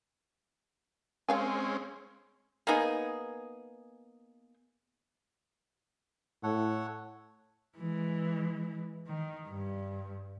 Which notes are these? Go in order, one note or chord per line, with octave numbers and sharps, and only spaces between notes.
G#3 C4 C#4 C#5 F5 G#5
A#3 B3 D#4 G#4
A2 A4 C#5 F#5
E3 G#3
D#3
G2